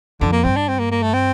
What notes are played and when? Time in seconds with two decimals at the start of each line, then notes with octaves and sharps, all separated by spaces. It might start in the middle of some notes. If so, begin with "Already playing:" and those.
0.21 F2 D3
0.32 A#3
0.44 G2 C4
0.57 D4
0.68 C4
0.79 A#3
0.91 A#3
1.02 A3
1.14 C4